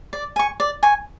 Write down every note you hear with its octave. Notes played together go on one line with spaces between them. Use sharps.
D5
G#5 C#6
D5
G#5 C#6